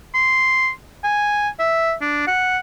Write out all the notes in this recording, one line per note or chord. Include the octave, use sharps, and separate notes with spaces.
C6
G#5
E5
D4
F#5